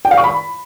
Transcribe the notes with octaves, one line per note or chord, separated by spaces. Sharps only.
G5
F5
C#6
B5